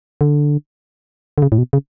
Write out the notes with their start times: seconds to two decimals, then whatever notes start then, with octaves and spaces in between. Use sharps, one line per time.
0.21 D3
1.38 D3
1.42 C#3
1.52 A2
1.58 B2
1.73 C#3